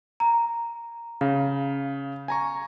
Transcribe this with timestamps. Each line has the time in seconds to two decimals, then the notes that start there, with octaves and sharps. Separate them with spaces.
0.20 A#5
1.21 C#3 F5
2.28 G#5 A#5 C#6